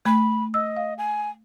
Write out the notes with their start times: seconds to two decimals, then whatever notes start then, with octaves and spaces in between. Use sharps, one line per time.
0.06 A3 B5
0.54 D#5 E6
0.77 F5
0.98 G#5